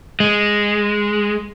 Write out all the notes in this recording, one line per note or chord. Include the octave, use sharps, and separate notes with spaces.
G#3